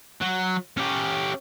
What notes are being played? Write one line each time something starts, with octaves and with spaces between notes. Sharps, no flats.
F#3
C#4 G4